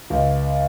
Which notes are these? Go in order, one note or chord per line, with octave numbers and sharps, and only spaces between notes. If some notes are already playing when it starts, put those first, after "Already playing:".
C#2